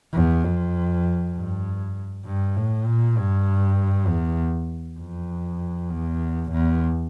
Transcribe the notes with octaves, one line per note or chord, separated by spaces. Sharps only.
E2
F2
G2
G2
A2
A#2
G2
E2
F2
E2
E2